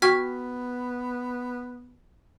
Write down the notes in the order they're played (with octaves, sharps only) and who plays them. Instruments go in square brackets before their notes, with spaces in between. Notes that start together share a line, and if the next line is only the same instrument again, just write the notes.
[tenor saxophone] B3 [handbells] F#4 G5 C#6 [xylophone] F6 G#6 B6